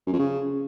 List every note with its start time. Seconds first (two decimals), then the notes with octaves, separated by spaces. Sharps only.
0.07 F#2
0.13 F2
0.19 C#3